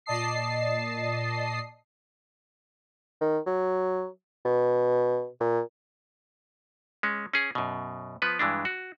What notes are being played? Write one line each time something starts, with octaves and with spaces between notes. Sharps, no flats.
A#2 D5 D#5 A5 D#6 C7
D#3
F#3
B2
A#2
G#3 C#4
C#4 G#4
F#2 B2
F3 B3 B4
G2 E3 G#3 D4
F#4